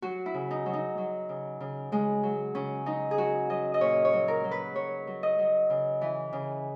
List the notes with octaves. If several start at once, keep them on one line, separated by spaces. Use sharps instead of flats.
F#3 F#4
E4
C#3
D#4
F#3
D#4
F#3
C#3
C#3
C#3 G#3
F#3
C#3 C#4
F#3 D#4
G#4
F#3 F#4
F#3 D#5
D#5
A#2 C#5
C#5
F#3
A#4
F#3
B4
F#3 C#5
F#3
D#5
F#3
C#3
E3
C#3